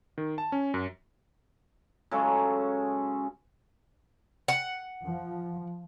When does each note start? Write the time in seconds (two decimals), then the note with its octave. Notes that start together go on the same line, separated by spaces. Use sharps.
0.18 D#3
0.38 A5
0.52 C#4
0.74 F#2
2.11 C#3 F#3 G#3 A4
4.48 F#5
5.04 F3